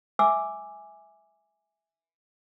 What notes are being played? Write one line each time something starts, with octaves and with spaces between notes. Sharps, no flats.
E5 G#5 D6 E6